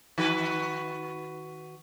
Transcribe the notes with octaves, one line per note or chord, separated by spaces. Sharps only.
D#3 F#4 B4